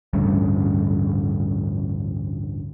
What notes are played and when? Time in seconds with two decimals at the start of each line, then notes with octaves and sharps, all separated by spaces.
0.13 A1 D2 G2 C#3